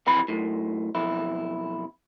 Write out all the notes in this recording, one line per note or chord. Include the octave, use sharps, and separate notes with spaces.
F2 C3 E3 B4 B5
F#2 A2
B1 F2 E4